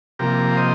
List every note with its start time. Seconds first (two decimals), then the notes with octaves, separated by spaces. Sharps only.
0.19 C3 F3 A#3 G4 A#4
0.52 F5
0.57 C5 D#5